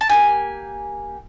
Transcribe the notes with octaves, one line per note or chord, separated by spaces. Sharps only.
A5
A#3 D#4 G4 G#5